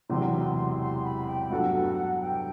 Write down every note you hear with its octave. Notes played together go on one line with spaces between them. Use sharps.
E1 E2 C3 F#3 C6
C6
B5
G5
G2 F#3 B3 F#4 A4 F#5
G5